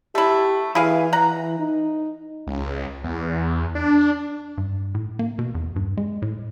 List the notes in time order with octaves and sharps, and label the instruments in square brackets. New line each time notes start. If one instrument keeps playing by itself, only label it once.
[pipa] A3 E4 [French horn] G4
[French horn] E3 [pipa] E4 G#4 F5
[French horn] E3 [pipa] F#5 A#5
[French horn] D#4
[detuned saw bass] C#2
E2
D4
[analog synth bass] G2
A2
A#3
B2
E2
G2
G#3
A2